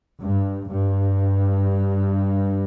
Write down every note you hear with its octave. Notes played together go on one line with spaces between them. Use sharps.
G2
G2